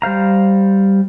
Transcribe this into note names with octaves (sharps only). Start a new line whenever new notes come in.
G3 C5 F5 A#5